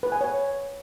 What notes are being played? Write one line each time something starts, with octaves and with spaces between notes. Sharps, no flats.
B4
G#5
C#5